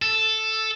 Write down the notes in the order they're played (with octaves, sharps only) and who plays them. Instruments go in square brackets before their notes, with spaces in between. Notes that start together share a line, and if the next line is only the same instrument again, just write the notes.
[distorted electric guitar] A4